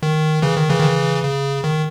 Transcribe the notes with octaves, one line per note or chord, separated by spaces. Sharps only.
D#3
C#3 E3
D#3
C#3 E3
D#3
C#3 E3
C#3
D#3